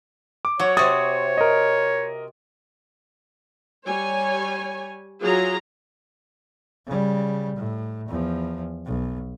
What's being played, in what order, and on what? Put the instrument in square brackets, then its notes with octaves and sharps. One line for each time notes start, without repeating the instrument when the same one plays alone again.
[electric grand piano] D6
[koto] F#3 [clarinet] C#5
[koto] C3 F#4 [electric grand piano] D#6 G#6 A6
[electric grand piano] A#4 D#5
[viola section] G3 C#5 G#5
F#3 F4 G#4 A#5
[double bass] C#3 G3
A2
E2 F3
B1